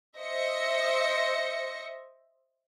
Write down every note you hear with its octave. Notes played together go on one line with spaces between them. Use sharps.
C5 D#5 E5 A#6 C#7